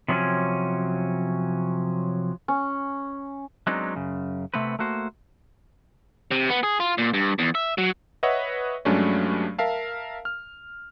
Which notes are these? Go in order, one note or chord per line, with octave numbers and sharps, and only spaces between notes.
C3 F3 F#3 C#4
C#4
F#3 G#3 B3 C4 D4 D#4
F#2 C#3
C3 A3 B3 C4 B4
A3 A#3 F#4 C5
C3
B3
G#4
F4
A#2
G2
E2
E5
F#3
B4 C#5 D#5 E5 F#5
G2 F#3 G#3 A3 C#4 D4
A#4 E5 F5 A5
F6